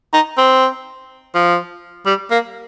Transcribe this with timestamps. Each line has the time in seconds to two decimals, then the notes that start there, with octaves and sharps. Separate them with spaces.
0.13 D#4
0.37 C4
1.35 F3
2.06 G3
2.31 A#3